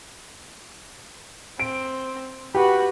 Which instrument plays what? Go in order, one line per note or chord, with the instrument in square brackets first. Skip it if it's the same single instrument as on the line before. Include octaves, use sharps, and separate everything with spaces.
[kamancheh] C4 [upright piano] D7
[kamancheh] F#4 B4 [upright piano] G4